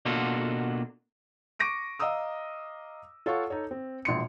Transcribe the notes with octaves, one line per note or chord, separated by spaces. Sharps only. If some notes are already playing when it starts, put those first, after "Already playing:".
B2 A#3 D4 F4 F#4 A4
C#6 D6 A#6 D7 D#7
D#5 F5 A#5 D#6 E6
F4 A4 C#5 F5 F#5 C#6
D#4 A4 C#5
C4
E1 A#1 C6 C#7